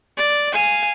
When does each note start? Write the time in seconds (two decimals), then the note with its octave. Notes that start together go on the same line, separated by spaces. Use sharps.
0.18 D5
0.53 F5 G#5